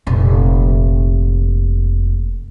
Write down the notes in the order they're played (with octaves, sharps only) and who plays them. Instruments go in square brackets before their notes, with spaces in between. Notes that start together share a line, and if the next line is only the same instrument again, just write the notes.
[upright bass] F1 A#2